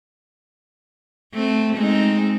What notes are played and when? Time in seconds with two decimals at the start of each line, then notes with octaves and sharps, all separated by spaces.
1.33 A3 C4
1.76 G#3 C4 D#4